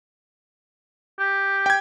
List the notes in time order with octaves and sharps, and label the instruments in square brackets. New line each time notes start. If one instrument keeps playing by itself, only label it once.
[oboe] G4
[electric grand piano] G5 G#6